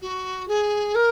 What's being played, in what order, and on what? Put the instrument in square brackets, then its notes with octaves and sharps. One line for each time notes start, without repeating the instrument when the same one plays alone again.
[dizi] F#4
G#4
A#4